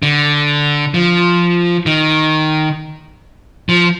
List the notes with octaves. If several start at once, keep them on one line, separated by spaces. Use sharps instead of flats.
D3
F3
D#3
F3